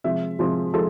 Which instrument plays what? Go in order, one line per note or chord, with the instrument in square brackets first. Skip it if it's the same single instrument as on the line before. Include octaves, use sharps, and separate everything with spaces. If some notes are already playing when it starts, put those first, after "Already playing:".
[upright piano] C3 F3 G#3 E5
C3 F3 G#3
F3 G#3 A4